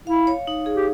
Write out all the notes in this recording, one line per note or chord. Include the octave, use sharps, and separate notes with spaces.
E4 F5
C#5
D#4
G#4
G4